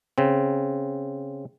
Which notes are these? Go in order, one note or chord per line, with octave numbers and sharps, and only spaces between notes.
C#3 C4